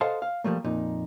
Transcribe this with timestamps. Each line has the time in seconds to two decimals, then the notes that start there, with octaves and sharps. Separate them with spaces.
0.01 A4 C5 D#5 F5 F#5 A5
0.22 F5
0.44 F3 G3 A3 A#3
0.64 F2 A#2 D#4